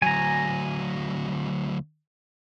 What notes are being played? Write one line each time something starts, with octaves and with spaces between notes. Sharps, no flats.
D2 F#3 G#5 A#5